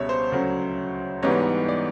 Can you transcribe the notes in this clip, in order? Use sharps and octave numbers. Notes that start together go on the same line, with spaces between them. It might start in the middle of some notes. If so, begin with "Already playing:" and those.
Already playing: C#2 B2 G3 C#5 E5
C5
D2 C#3 F#3
G#2 E3 G3 B3 D#4 C#5
D5